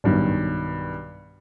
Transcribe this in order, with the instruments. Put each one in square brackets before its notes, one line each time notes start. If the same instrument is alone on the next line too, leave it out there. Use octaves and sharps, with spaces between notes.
[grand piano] B1 G2 D#3